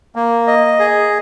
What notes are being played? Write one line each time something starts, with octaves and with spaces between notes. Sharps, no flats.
A#3
D#5
G#4